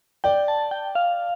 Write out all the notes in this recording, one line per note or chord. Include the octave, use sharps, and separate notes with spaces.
D5 G5
A5
G5
F5